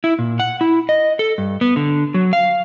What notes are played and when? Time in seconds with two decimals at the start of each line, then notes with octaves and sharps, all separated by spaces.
0.04 E4
0.19 A#2
0.40 F#5
0.61 E4
0.89 D#5
1.19 A4
1.38 G2
1.61 B3
1.76 D3
2.14 F#3
2.33 F5